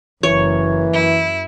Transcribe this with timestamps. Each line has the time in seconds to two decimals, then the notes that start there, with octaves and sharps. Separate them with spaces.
0.23 F#1 E3 A#3 C#5
0.93 F#2 E4